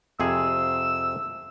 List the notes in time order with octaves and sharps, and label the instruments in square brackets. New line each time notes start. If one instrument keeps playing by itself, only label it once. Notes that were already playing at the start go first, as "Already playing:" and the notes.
[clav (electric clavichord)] F2 C3 G#4 [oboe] E6